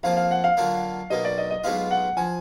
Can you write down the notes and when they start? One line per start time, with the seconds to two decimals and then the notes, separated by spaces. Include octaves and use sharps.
0.03 F2 F3 A#3 F4 F5
0.17 F5
0.31 F#5
0.44 F5
0.57 D3 F#3 A#3 D4 F4
1.10 B1 B2 A#3 D#5
1.25 D5
1.38 D#5
1.51 D#5
1.64 B1 B2 G#3 B3 F4 F5
1.91 F#5
2.17 F3 G#5